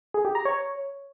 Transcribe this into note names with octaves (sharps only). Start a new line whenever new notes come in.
G#4
G4
A#5
C#5